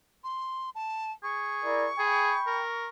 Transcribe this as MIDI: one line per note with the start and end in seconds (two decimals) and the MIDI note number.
0.24 0.70 84
0.75 1.12 81
1.23 1.90 68
1.23 2.89 85
1.63 1.87 64
1.63 1.87 70
1.63 1.87 74
1.99 2.36 68
1.99 2.60 79
1.99 2.60 83
2.47 2.89 70